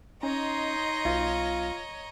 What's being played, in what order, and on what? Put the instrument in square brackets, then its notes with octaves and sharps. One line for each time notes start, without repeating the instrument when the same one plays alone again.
[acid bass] C#4 [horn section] D#4 C6 [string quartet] C#5 D#5 A#5
[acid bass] B1 [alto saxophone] F4